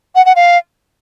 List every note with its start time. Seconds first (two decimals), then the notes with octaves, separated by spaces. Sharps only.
0.15 F#5
0.26 F#5
0.36 F5